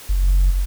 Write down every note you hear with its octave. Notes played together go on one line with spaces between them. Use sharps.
F#1